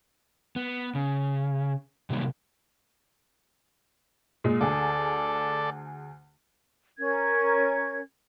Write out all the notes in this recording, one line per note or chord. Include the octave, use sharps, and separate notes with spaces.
B3
C#3
C3 D#3 F#3 G3 A#3
A#2 G#3
D2 G#4 A4 D5
C#4 A#4 G#6